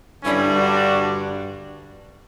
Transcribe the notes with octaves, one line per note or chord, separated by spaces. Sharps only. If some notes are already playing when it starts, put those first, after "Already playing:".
G2 D3 G3 C#4 E4
D4 F#4